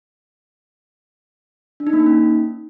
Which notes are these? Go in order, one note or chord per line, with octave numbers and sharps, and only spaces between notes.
D4
D#4
A#3
D#4
C#4